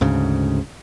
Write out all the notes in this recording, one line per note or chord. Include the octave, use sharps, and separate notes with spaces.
D2 G#2 C#3